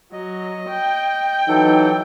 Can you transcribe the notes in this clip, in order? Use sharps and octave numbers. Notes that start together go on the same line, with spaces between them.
F#3 D#5
G5
E3 F#3 D#4 A4